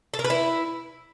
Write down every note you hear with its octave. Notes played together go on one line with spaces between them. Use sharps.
A4
A#4
B4
E4